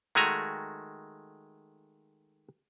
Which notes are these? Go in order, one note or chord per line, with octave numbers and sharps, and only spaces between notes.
D#3 G#3 A3 F#4 G#5 A#5